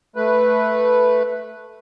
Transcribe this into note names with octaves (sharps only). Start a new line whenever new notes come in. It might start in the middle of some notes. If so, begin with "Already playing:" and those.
A3 B4